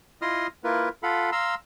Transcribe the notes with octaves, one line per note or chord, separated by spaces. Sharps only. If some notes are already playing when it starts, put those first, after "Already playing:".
E4 F4 D#5 C6 D#6 F6
A#3 E4 F4 A#4 B4
F4 A4 F5 F#5 B5
F5 A#5 C6 E6